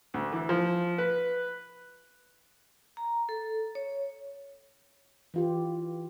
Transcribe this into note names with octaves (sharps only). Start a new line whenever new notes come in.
D2
E3
F3
B4
A#5
A4
C#5
E3 F4 G4